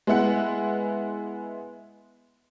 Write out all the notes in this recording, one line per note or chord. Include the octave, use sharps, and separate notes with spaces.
G#3 B3 E4 F#5